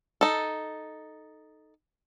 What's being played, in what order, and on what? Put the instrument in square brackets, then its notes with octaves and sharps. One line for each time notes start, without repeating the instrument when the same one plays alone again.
[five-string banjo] D#4 A4